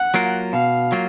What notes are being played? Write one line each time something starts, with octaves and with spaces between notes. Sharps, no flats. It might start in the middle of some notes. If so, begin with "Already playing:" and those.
Already playing: F#5
F#3 A#3 F4 A#4
B2 F5
F#3 A#3 F4